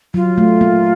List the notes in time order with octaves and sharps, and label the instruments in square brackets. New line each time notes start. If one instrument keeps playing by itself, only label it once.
[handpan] F#3 [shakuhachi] F4
[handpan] A3
A#3